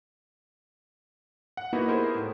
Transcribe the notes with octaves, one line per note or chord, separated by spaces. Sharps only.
F#5
A#3 B3 D#4 E4 F#4 B4
E4 G4 G#4 A#4 C5 D#5
A2